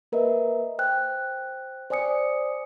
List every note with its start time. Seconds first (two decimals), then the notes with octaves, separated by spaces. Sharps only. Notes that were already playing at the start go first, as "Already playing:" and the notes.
0.12 A#3 A#4 B4 D#5 E5
0.79 C5 G5 F#6
1.90 C5 D5 G#5 D#6 C#7